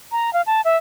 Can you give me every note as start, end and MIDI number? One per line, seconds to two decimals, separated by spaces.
0.12 0.33 82
0.33 0.42 77
0.46 0.61 81
0.65 0.77 76